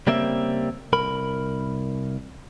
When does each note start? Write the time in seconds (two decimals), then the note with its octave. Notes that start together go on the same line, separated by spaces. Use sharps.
0.07 C#3 G3 A#3 C4 E5
0.93 C2 A#4 B5